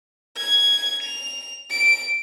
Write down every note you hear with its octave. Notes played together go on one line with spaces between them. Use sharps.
G#6
F7
D7